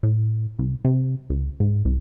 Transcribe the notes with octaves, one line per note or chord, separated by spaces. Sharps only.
A2
C2
C3
C#2
G#2
C2